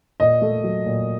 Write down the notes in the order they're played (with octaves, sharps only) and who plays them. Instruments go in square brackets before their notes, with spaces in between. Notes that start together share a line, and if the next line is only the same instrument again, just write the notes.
[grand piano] A#2 [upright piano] D#5
[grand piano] A3
F#3
A#2